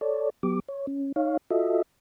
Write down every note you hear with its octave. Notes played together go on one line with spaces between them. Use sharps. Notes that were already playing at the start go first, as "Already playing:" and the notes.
A4 C#5 D5
F#3 B3 G4 D6
C#5
C#4
D#4 C#5 F5
F4 F#4 A4 D#5 E5